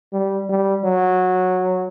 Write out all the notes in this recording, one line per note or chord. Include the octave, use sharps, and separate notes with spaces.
G3
G3
F#3